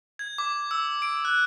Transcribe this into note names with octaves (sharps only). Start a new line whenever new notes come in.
G#6
D6
E6
D7
F#6